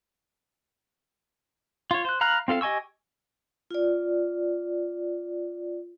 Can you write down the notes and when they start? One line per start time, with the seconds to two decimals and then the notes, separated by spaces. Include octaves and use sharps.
1.91 F4 C#5
2.05 C5 F#6
2.21 F5 A#5 B5 F6 F#6
2.48 C4 F4 A4 F5
2.61 G4 D#5 G#5 C#6 E6
3.71 F4 D5